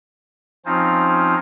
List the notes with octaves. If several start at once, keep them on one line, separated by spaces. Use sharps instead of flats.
F3 C4 C#4 D#4 F4 C5